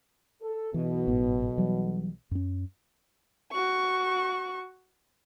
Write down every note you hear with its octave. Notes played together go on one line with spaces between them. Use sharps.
A4
B1 B2 E3
G#1 A2 B3
E3 F#3 G3
F#2 C#4
F#4 C#6